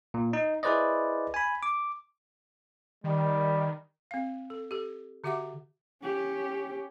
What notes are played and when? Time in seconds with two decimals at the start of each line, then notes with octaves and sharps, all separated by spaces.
0.14 A#2
0.33 D#4
0.63 E4 G#4 B4 C5 D5 D#5
1.34 G#5 B5
1.63 D6
3.04 D#3 G3
4.11 C4 F5
4.50 A4
4.71 G4 A4
5.24 D3 F#4 G4 E5 F#5 D6
6.03 C#4 G4